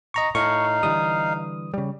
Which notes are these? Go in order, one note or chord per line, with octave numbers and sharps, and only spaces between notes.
D#5 A#5 C#6
A2 D#4 F5 C#6
D3 E3 G3 D#6
C#3 G3